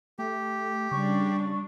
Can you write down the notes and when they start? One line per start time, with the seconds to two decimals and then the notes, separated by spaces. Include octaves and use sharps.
0.19 A3 G4
0.91 C#3 G3 D4 C#6